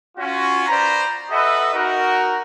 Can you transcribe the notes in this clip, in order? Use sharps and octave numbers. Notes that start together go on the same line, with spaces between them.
C#4 F4 F#4
B4 C5 D5 A#5
F#4 A4 B4 D#5 E5 F#5
D#4 F#4 A#4